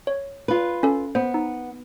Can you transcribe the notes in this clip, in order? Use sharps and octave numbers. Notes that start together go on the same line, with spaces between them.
C#5
F4 B4
C#4 A4
B3 C5
D#4